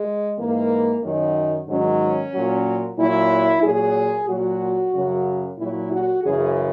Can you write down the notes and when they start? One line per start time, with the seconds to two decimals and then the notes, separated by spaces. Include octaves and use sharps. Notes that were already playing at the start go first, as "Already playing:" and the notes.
Already playing: G#3
0.38 G#2 E3 A#3
1.02 F#2 D#3 F#3
1.67 G#2 D#3 F#3 C#4
2.32 A#2 F#3
2.98 A#2 F#3 E4
3.62 A#2 F#3 G#4
4.27 A#2 F#3 F#4
4.93 F#2 C#3 F#3
5.57 A#2 F#3 E4
5.90 F#4
6.22 F#2 C#3 E3 G#4